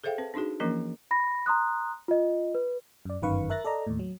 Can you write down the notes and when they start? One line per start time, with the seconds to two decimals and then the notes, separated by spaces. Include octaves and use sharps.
0.04 G#4 A4 C5 E5 F5 G5
0.18 C4 B4
0.34 C4 D4 D#4 F#4 G#4
0.60 E3 F3 A#3 C#4 A#4 D#5
1.11 B5 A#6
1.46 A#5 C6 D#6 F#6
2.08 F4 D#5
2.55 B4
3.05 F#2 D5
3.22 G1 F#2 D#3 B4 F5 C#6
3.50 A#4 E5 F#6 A6 A#6
3.65 A4 D5 D#5 A#5
3.87 D#2 A2
3.99 F#3